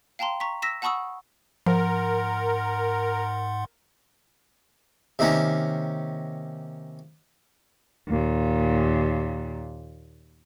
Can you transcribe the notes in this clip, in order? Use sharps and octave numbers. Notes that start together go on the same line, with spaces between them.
F5 G5 A5 A#5 C6
A#5 C#6 B6
E6 A#6 B6 E7
F#5 A5 B5 C#6 D#6 E6
G#2 F3 A#4 F#5 C6
C3 D#3 A#3 C#4
D#2 A#2